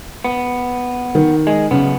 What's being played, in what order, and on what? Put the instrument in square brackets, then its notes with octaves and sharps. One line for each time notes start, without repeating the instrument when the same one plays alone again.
[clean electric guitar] B3
[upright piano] D#3
[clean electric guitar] G#3
[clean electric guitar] F#2 B3 [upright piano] C#3